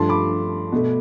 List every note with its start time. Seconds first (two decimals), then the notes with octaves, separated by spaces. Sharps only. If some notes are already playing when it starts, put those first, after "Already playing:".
Already playing: G2 F3 A3 A5 C6
0.09 B5 D6
0.72 B2 A3